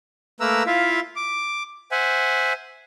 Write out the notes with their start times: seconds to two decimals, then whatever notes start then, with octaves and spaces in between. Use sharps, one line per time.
0.40 A3 A#3 A#4 B4 A#5 E6
0.67 E4 F4 E5 F5
1.16 D6
1.92 C5 E5 F#5 G#5